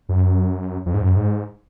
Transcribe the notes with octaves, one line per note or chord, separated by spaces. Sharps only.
F#2
F2
G#2
F#2
G#2